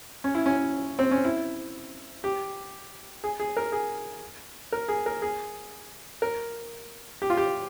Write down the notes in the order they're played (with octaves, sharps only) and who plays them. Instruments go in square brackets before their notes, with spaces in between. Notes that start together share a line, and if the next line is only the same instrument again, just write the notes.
[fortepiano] C#4
E4
C#4
C4
C#4
E4
G4
G#4
G#4
A#4
G#4
A#4
G#4
A#4
G#4
A#4
G4
F4
G4